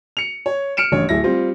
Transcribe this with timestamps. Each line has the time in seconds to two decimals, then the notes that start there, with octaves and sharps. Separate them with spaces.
0.17 C#7 F7
0.46 C#5
0.77 F6 C#7 D7 E7
0.92 A1 G2 C#5
1.09 D1 E4 A#6
1.24 G3 C4 F4